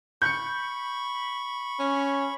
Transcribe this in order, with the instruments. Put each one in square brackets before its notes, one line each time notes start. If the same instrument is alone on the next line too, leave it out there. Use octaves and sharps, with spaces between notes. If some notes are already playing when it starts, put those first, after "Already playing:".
[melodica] B5 C#6 [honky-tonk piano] G6 C#7
[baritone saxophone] C#4